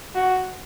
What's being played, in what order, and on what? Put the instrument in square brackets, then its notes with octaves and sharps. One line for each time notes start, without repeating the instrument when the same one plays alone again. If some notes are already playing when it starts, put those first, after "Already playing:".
[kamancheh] F#4